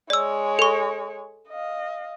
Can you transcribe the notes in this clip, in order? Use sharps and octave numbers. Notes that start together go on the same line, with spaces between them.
G#3 C#5 D5 E6
A4 C#6
D#5 F5